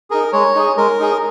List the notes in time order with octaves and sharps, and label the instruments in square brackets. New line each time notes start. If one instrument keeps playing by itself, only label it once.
[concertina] D#4 G#4 A#4
G#3 C#5
D#4 G#4
G#3 A#4
D#4 G#4